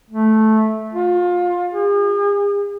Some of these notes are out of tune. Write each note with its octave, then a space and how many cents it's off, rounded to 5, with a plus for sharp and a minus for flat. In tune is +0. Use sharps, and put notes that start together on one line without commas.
A3 -10
F4 +25
G#4 -40